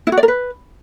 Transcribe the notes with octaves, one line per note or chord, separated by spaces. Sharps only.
E4
F#4
D5
A#4
B4